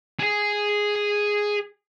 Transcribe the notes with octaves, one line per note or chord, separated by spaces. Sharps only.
G#4 G#5